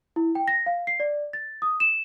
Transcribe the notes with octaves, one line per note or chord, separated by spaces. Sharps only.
E4
G5
A#6
F5
C7
D5
A6
D#6
E7